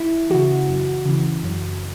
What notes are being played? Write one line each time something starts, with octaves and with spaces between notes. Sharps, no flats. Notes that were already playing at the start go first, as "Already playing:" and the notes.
Already playing: E4
C#3 E3 F#4
F#2
C#3 E3
F#2